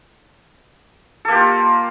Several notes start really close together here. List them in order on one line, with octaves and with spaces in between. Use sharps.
A4 A#3 G4 F4